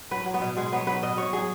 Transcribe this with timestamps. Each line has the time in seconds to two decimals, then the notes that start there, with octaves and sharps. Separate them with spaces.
0.11 F#3 B4
0.26 F#3
0.34 B3
0.41 B2
0.56 B2 G#3
0.72 F#3 B3
0.87 F#3 B4
1.03 B2 D#5
1.17 B2 C#5
1.33 F#3 G#4